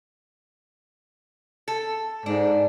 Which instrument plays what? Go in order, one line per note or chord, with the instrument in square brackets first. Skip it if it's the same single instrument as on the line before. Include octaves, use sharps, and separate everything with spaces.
[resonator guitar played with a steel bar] A4
[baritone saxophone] G#2 [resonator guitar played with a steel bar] D4